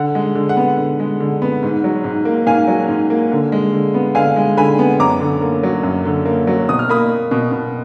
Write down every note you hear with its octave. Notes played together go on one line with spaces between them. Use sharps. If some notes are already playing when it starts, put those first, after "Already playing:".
Already playing: D3 F#5
G#3
D3
F#5
B3
D3
G#3
D3
B3
G#2
F#3
G#2
A#3
G#2 F5 G#5
F#3
G#2
A#3
D3
G#3
D3
B3
D3 F5 G#5
G#3
D3 G#5 B5
B3
F#2 A#5 D6
D3
A#3
F#3
F#2
D3
A#3
F#3
B2 D#6
F6
A#3 B5 D#6
A#3
B2
B2